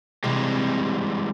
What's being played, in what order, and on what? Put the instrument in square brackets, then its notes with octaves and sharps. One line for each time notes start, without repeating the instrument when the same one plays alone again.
[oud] C3 [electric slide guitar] E3 G3 G#3